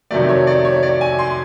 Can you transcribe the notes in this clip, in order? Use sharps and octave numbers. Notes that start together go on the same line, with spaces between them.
F2 C3 D#3 F#3 A3 D5
C#5
D5
C#5
D5
G#5
C6